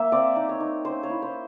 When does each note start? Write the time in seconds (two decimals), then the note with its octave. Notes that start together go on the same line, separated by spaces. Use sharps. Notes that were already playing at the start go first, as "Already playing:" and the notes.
Already playing: A#3 E5
0.12 C4 D5
0.36 D#4
0.49 C#5
0.60 D#4
0.85 C#4 C5
1.03 C#5
1.10 E4
1.22 C5